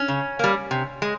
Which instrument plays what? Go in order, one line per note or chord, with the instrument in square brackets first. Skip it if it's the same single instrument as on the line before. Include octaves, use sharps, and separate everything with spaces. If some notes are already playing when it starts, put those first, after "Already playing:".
Already playing: [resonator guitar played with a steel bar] C#4
C#3
G3 A#3
C3
G#3